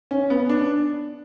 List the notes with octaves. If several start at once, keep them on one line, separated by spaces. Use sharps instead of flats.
C#4
B3
D4